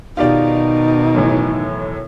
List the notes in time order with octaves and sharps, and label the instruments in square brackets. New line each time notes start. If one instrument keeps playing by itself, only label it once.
[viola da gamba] B2 D#3 [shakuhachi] D#4 [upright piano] F4 G4 D5
[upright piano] F#2 A2 E3